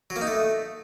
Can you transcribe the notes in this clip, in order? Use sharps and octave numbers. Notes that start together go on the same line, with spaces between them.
F#3
A#3
D#4
A3